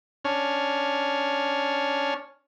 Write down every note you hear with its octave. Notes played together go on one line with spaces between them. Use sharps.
C#4 D4 C#5 F6